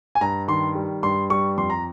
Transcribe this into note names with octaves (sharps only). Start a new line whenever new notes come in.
G#5
G2 A#5
D#3 C6
G3
G2 C6
G3 C#6
F2 C6
A#5